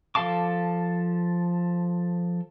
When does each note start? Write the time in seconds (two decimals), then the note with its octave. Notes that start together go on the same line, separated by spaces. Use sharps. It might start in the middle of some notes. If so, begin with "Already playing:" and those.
0.15 F3 A4 F5 A5 D6